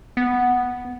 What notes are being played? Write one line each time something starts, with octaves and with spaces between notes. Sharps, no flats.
B3